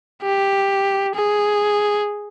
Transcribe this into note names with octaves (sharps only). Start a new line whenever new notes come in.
G4
G#4